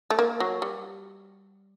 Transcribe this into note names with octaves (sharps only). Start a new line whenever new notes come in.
A3
A#3
F#3
G3